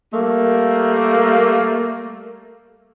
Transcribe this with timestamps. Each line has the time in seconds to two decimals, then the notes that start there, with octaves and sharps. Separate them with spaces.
0.14 G3 A3 A#3